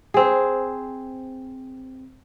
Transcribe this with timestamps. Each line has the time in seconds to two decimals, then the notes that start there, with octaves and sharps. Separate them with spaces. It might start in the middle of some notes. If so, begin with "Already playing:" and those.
0.14 C4 G#4